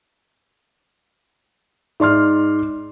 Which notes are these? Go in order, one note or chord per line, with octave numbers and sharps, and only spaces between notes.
G#2 D5 C6 F6